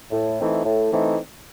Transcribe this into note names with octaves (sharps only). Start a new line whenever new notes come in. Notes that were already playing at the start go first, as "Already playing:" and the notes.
A2
E3 A3 C4 D#4
A2
E3 A3 C4 D#4